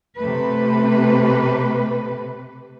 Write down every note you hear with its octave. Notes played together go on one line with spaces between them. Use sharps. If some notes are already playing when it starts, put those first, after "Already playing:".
C3 A3 B4